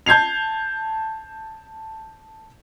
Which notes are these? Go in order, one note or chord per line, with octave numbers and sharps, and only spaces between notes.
A5 G6 G#6 C7 F7